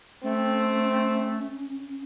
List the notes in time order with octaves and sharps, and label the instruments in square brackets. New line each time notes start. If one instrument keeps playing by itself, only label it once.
[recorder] A3 [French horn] C4 [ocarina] C#4